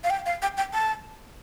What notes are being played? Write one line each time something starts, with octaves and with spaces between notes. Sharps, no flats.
F5
G5
F5
G5
G5
A5